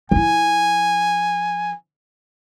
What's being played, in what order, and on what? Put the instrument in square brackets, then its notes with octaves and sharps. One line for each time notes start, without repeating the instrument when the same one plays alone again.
[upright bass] F3 E4 [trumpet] G#5